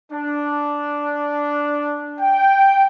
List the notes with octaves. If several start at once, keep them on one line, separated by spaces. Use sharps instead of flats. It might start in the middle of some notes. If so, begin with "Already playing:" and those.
D4
G5